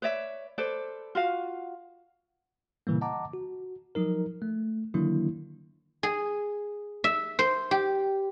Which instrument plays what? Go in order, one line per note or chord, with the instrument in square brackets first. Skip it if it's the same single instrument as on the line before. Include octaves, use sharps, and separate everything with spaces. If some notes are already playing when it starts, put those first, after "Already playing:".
[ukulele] B4 C#5 D5 E5
A4 B4 C5 D5
F4 F#4 F5
[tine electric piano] A#2 C#3 E3 G3 A#3
D#5 F#5 A5 A#5 D6
F#4
F3 F#3 D#4 A#4
A3
D3 D#3 F#3 A#3 D4 E4
[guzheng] G#4
E5
C5
G4